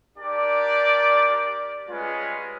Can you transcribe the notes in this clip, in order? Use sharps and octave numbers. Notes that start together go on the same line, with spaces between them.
D4 G4 A#4 D5
G3 G#3 C#4 F4 B4